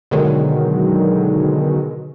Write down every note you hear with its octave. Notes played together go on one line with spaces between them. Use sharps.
B2 D3 D#3 F#3 G#3